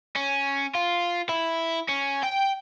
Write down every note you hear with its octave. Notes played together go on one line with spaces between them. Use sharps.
C#4
F4
E4
C#4
G5